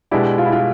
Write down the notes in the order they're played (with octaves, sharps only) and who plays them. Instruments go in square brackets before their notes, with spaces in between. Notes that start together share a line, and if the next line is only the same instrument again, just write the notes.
[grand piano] B2 G#3 B3 D4 G4 [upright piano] E4
[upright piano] F4
E4
F4